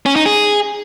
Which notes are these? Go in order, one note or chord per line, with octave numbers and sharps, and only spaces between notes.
C#4
D#4
G#4